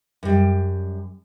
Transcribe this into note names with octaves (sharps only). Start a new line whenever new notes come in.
F#2 G3